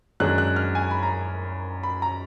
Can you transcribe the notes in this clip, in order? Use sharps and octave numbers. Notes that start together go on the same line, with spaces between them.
F#2 D#3 G#3 D4 F#6
F#6
F6
G#5
B5
A#5
B5
A#5